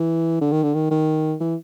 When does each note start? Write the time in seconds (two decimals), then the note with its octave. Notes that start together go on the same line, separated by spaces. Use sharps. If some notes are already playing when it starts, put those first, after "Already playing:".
Already playing: E3
0.41 D3
0.52 D#3
0.63 D3
0.74 D#3
0.91 D#3
1.40 E3